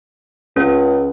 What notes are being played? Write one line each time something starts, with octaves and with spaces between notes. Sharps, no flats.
C#2 C#4